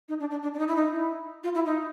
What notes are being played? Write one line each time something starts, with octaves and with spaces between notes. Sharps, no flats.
D#4
D4
D4
D4
D4
D#4
E4
D#4
E4
F4
E4
D#4